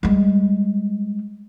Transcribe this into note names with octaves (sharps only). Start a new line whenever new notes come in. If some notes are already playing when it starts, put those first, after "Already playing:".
G3 G#3